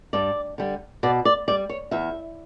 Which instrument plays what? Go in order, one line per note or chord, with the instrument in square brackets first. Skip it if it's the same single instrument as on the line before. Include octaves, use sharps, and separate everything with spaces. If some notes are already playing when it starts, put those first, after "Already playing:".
[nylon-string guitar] G2 D5
D3 G3
B2 D5
D5
G3 D5
C#5
E2 E5